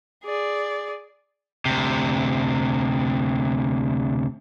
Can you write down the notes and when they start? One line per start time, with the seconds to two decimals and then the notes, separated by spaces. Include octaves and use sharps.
0.24 G#4 D5
1.65 D2 C3